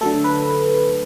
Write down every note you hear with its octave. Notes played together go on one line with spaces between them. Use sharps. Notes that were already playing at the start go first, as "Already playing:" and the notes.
D3 F#3 A3 A4
B4